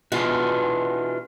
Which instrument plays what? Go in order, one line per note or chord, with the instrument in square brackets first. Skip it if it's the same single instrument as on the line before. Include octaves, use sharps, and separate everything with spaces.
[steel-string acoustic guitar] B2 E3 G#3 [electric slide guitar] D4 F4 F#4